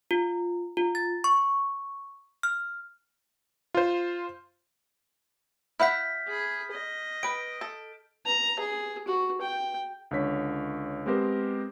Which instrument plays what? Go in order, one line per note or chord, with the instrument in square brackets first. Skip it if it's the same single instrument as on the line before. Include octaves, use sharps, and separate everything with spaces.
[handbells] F4
F4
A6
C#6
F6
[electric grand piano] F4 C5
[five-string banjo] E4 F5 F#5 [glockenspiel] F6 G6 B6
[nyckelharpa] G#4 B5
D#5
[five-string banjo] B4 G5 [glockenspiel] D7
[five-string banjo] A4
[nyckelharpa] A#5
G#4
F#4
G5
[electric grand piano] C#2 D3 C#5 B6
G#3 B3 C4 G4 A#4 C5